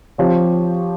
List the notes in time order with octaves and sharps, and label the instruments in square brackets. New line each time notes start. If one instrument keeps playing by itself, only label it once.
[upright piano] F3 C4 G4 C#5